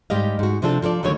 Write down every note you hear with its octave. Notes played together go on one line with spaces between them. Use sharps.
G#2 G3 G4 D#5 F5
G#2 F#4
C3 F3 C4 D4 F4 A4
F3 F4 A4 D5
D2 D3 D#3 F#3 A#3 C#5